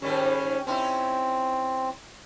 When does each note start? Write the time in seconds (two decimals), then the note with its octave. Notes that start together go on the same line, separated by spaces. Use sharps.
0.02 G#2 D#3 G3 C#4
0.67 C4 C#4 D#4 E4